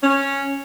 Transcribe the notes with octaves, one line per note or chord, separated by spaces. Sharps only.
C#4